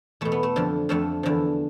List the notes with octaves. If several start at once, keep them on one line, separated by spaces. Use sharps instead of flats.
E2 B2 A3
B3
A3
F2 D3 F3
F2 D3 F3 A3
E2 D3 F3